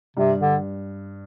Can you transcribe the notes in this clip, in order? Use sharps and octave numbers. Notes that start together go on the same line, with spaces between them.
G2 C3
D3